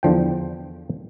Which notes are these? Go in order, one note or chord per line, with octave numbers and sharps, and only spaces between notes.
E2 D3 F3 G5